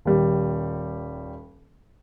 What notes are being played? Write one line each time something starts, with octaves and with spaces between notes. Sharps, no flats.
D#1 G3